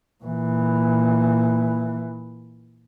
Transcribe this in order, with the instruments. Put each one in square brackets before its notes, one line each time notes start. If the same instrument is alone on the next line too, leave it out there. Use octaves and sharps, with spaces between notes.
[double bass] A#2 E3